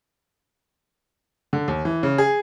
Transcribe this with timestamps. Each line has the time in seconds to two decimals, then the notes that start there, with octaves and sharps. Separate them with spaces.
1.53 D3
1.68 D#2
1.85 E3
2.03 C#3
2.18 G#4